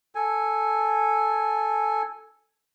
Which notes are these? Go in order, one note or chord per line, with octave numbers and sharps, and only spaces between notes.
A4 G#5